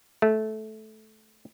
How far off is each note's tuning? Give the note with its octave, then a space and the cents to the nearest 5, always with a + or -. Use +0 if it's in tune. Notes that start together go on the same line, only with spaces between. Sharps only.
A3 -15